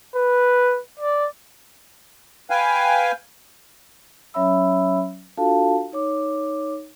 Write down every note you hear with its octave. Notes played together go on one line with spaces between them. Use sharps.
B4
D5
B4 F5 G5 G#5
F#3 C#4 C#5 E5 B5 E6
D4 F4 F#4 A4 F5 A5
D#4 C#5 D6